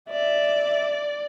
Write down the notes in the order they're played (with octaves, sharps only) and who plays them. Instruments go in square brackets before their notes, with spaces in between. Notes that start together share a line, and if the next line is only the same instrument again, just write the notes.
[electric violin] D5 [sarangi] E5